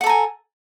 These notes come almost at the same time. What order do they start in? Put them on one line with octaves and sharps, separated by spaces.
F#5 A4 A#5 G#5